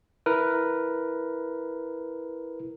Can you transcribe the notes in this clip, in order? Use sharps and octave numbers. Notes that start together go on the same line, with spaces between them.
E4 A#4 B4